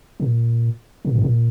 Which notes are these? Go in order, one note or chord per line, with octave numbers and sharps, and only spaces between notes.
A#2
A#2
G2
A#2